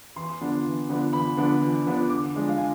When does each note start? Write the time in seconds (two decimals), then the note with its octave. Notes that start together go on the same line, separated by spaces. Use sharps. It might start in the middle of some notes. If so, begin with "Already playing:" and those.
0.16 E2 C6
0.41 D3 F3 B3 D4
0.65 E2
0.89 D3 F3 B3 D4
1.13 E2 B5
1.37 D3 F3 B3 D4
1.62 E2
1.86 D3 F3 B3 D4
2.10 D3 D6
2.35 F3 G#3 D4
2.49 F5
2.58 D3 G#5